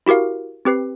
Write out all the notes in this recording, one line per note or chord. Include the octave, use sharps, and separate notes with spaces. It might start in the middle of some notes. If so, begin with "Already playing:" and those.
E4 F#4 G4 A#4 F5
C4 G4 B4 C7